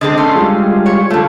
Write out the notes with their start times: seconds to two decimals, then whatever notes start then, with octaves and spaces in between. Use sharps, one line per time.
0.01 D3 G#3 C4 D#5 A6
0.17 A3 C#4 C6
0.36 G3 G#3 F4
0.86 C#5
1.10 D3 A3 F4 A4